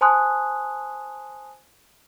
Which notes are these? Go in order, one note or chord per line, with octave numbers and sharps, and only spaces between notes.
C5 G#5 A5 C6 D#6 F#6